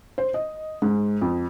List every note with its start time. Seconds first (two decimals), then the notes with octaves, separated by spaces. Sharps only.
0.18 C5
0.34 D#5
0.82 G#2
1.21 F2